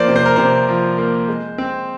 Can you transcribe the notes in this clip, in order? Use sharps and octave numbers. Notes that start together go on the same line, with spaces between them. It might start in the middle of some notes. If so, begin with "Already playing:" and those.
Already playing: F3 A#3 C5 D5
C3
C5
A#4
C3 C5
F3
A#3
G#3
C4